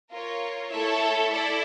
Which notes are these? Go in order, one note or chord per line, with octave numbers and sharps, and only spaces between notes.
F4 A#4 C#5
A3 E4 A4 C#5 E5
E4 A4 D5